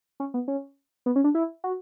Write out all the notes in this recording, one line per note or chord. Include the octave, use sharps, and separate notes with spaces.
C#4
B3
C#4
B3
C#4
D4
E4
F#4